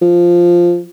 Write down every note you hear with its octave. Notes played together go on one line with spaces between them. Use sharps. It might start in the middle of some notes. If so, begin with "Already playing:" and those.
F3